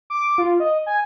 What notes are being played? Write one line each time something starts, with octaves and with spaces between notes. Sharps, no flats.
D6
F4
D#5
G#5